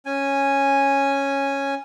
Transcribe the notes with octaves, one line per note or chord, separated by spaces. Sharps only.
C#4 G#5